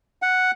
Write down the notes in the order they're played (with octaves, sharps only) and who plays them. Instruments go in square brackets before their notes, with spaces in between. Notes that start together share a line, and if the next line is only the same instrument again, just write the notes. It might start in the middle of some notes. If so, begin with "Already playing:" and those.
[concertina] F#5